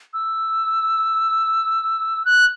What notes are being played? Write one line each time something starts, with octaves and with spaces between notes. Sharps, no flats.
E6
F#6